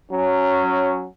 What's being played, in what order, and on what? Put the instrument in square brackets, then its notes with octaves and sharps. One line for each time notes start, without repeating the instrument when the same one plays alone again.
[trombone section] F#3 C#4